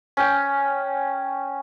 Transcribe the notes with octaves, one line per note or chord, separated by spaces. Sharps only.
C#4 G5